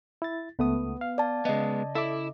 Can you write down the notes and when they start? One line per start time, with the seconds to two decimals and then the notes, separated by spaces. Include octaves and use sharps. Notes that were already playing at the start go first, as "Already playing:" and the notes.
0.22 E4 A6
0.59 C#2 A3 B3 D#6
1.01 F5
1.18 D5 A5
1.45 C#3 G#3 B3 D#5
1.95 E4 A4 E5 D6